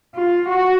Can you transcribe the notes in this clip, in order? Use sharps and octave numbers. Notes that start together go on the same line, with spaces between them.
F4
F#4